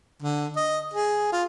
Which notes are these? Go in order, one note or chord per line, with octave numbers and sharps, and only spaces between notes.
D3
D#5
G#4
F4